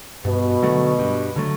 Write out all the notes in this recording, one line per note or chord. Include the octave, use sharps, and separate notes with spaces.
G2 B2
D3 F#3 A3
G2
D3 F#3 A3